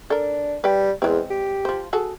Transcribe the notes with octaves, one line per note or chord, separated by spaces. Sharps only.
D4 A4 A#4
G3 B4 G5
E2 G#3 C4
G4
F3 C5
F#4 G#4 A4